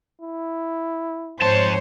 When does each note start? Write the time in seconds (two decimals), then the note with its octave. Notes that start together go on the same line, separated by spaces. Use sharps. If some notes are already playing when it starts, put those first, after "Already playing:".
0.21 E4
1.41 F2 G#2 C5 C#5 A5